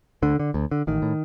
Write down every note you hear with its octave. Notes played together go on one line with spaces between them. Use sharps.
D2 D3
D3
D2
D3
A1 D#3
A2